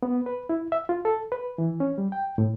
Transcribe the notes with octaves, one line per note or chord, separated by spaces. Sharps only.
B3
B4
E4
E5
F4
A4
B4
E3
C#4
G3
G5
A2